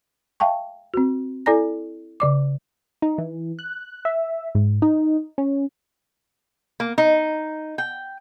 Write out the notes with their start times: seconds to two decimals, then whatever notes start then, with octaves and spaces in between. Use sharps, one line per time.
0.40 E5 F5 G5 A5 C#6
0.94 C4 F#4
1.46 E4 A4 D5 G#5 A#5 A#6
2.20 C#3 D5 D6
3.02 D#4
3.18 E3
3.59 F#6
4.05 E5
4.55 G#2
4.82 D#4
5.38 C#4
6.80 A#3
6.98 D#4
7.78 G5